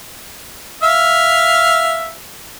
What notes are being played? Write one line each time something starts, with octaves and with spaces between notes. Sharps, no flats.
E5 F5